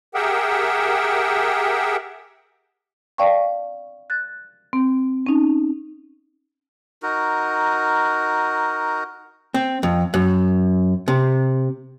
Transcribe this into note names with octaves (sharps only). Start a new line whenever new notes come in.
G4 G#4 A#4 E5 F#5 G5
D5 F5 G5 A5 C#6
F#6 A6
C4
C#4 D#4
D#4 F#4 A#4
C4
F2
F#2
C3